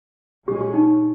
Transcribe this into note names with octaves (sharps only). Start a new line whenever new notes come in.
A#2 G#3 C#4 G4
G4
D#4